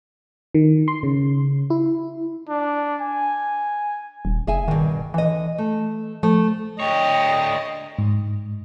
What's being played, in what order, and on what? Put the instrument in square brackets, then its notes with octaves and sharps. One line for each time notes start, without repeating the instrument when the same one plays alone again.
[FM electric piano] D#3
C6
C#3
E4
[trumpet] D4
G#5
[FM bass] D#1
[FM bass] F#1 [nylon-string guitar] G#4 E5 G#5
[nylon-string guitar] G2 B2 [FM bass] D#3
[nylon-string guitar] D3 D#5 [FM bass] E3
[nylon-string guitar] A3
[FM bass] F3 [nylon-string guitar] A3
[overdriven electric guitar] D2 C#5 [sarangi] D#5 [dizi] G5
[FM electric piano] G#2